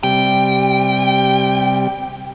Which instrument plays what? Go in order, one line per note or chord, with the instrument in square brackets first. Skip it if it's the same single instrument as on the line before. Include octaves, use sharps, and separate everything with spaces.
[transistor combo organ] C3 G3 [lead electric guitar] G5